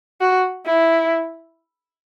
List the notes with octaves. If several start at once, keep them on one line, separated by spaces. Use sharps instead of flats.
F#4
E4